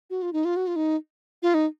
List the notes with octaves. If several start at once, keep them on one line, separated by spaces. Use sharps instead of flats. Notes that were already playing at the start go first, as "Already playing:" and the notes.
F#4
F4
D#4
F4
F#4
F4
D#4
F4
D#4